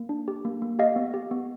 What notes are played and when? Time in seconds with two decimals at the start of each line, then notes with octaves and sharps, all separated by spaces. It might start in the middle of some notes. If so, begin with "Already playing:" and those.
Already playing: A#3
0.09 D4
0.28 G4
0.45 A#3
0.62 A#3
0.79 G4 D#5 F5
0.96 B3
1.14 G4
1.31 B3